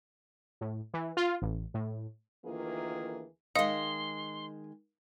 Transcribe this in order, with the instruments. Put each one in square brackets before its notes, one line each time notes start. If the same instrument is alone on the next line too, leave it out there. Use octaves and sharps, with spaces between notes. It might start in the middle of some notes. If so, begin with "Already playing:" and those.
[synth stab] A2
E3
F4
A1
A2
[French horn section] D2 D#3 E3 A#3 F4 G#4
[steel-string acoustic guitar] D#3 G#3 [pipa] D#5 [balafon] F5 [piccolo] C6